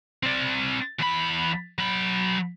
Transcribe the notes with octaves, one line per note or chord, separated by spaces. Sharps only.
C4 D5
E2 B5
F#3 B5